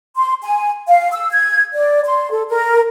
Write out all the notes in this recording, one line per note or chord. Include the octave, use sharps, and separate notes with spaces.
C6
G#5
F5
E6
G#6
D5
C6
A4
A#4